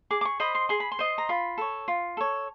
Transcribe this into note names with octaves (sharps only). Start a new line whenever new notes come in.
G#4 D6
D6
C#6
C5 D#5 B5
C6
G#4 C6
B5
C6
C5 D#5
A#5
F4 B5
A4 C#5
F4
A4 C#5